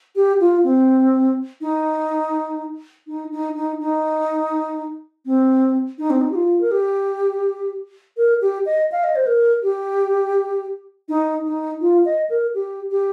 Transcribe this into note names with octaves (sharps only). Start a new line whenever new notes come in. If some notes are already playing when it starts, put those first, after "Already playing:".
G4
F4
C4
D#4
D#4
D#4
D#4
D#4
C4
D#4
C4
D#4
G4
F4
A#4
G4
A#4
G4
D#5
F5
D#5
C5
A#4
G4
D#4
D#4
F4
D#5
A#4
G4
G4